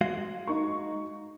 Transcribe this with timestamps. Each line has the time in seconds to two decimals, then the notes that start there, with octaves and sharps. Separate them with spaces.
0.01 G#3 F#4 F5
0.47 D#4 C#6